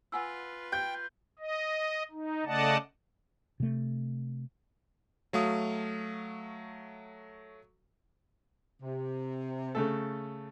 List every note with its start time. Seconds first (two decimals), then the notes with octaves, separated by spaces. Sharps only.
0.12 F4 B4 F#5 G#5 E6
0.72 G5 G6
1.39 D#5
2.12 D#4
2.46 C#3 A3 D5 D#5 F#5 A5
3.60 C3 A3
5.33 F#3 A3 F5 D#6
8.82 C3
9.75 C#3 A3 A4